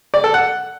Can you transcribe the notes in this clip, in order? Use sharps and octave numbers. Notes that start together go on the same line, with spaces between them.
D5
A4
F#5